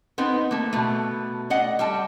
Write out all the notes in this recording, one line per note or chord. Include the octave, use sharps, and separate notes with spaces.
B3 C4 D#4
A3 A#3
B2 A3
D5 D#5 F#5
G3 G5 A5